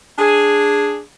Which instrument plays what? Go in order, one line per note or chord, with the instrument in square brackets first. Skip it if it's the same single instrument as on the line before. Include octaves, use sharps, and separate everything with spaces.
[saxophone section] D4 G#4